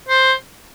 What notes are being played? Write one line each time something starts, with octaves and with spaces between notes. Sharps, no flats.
C5